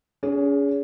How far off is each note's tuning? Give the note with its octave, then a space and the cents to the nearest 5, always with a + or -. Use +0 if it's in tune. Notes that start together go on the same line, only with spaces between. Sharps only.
C#4 +40 G#4 +0